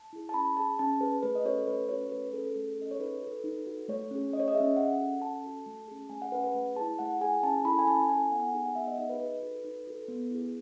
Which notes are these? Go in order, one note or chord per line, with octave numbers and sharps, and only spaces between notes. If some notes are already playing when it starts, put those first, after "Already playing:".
Already playing: A5
E4 G#4
A5
C#4 B5
G#4 A5
C#4 A5
G#4 B4
A3 B4
D#5
C#4 F#4 A4 C#5
A3 B4
C#4 F#4 A4 C#5
A3 B4
C#4 G#4 A4
A3
C#4 G#4 D#5
C#5
D#4 B4
F#4 A4
D#4
F#4 A4
A3 C#5
C#4 G#4
A3 D#5
C#5
D#5
G#4 E5
C#4
C#4 F#5
F#4 A4
C#4 A5
F#4 A4
A3
C#4 G#4
A3 G#5
F#5
C#4 G#4 B4
B4
A3
E4 G#4 A5
A3 F#5
E4 G#4 G#5
C#4 A5
E4 A4 B5
G#5
C#4 A5
E4 A4 G#5
B3 F#5
G#5
D#4 G#4 F#5
F#5
B3 E5
D#5
D#4 G#4 D#5
B4
D#4 B4
F#4 A4
D#4
F#4 A4
B3
E4 G#4